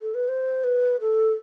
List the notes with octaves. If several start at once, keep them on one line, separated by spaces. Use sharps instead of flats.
A4
B4
C5
B4
A4